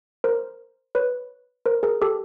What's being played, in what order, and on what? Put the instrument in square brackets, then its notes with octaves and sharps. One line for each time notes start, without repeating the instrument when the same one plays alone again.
[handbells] A#4 C5
B4 C#5
A#4 C5
G#4 A#4
G4 A4